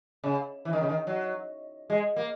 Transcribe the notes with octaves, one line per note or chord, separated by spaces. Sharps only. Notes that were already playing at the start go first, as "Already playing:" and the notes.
C#3
E3
D#3
C#3
D#3
F#3
G#3
A#3